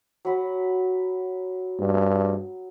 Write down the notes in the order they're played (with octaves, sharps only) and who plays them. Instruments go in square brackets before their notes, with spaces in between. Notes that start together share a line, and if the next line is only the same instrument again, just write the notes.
[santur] F#3 B5
[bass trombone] G2